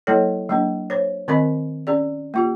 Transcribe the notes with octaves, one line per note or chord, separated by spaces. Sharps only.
F#3 A#3 E4 A4 C#5
F#3 A#3 D4
C5 C#5
D#3 C4 A#4 D#5 B5
C#4 G#4 D5
A#3 F4 G4